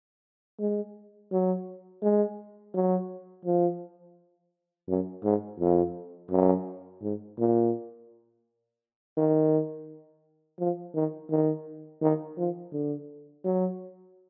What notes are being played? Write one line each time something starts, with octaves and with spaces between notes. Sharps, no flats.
G#3
F#3
G#3
F#3
F3
F#2
G#2
F2
F#2
G#2
A#2
D#3
F3
D#3
D#3
D#3
F3
D3
F#3